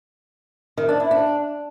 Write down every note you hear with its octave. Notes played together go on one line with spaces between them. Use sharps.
D#3
D4
E4
D4